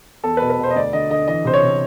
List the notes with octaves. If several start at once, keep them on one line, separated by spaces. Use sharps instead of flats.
E2 A4
B2 B4
B4
B2
C5
D#5
D2 D5
D3 D#5
D3 D#5
E3 D#5
C3 C5
C#5
C3